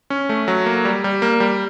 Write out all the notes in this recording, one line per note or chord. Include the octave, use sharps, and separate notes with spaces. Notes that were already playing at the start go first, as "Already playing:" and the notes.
C#4
A3
F#3
A#3
G3
G3
A#3
G3